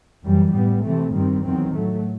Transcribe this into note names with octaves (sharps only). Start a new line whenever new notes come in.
F#2 E3 G3
A2 G3 B3
C3 E3 A3 C4
G2 D#3 G3 C4
E2 D#3 F#3 C4
A2 F#3 A3